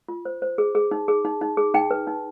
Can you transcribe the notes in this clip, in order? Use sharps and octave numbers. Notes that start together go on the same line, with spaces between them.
F4
C5
C5
G#4
G#4
D#4
G#4
D#4
D#4
G#4
D#4 G5
B4
D#4